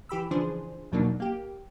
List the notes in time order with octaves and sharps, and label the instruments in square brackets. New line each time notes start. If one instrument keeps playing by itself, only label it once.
[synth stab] E3 G4 B5 E6
C#3 E3 F3 D4 G#4 C5
E2 B2 F#3 A#3 D4 D#4
A#3 G4